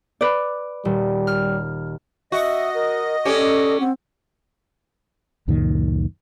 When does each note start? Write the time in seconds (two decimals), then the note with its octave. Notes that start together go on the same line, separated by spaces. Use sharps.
0.21 B4 D5
0.85 D#1 G3
1.27 F6
2.32 F#4 D#5 E5
2.74 A#4
3.25 C#4 G4 A4 D5
3.80 C4 F#5
5.48 C#2 F#2 A#2 D#3